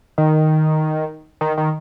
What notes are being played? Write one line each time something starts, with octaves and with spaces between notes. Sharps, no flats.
D#3
D#3
D#3